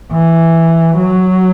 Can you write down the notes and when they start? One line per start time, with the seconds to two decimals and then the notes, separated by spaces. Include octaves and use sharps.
0.12 E3
0.98 F#3